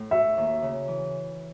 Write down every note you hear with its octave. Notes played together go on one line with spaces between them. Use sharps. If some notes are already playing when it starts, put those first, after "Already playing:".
Already playing: A2
F#4 E5
D#2
C#3
E3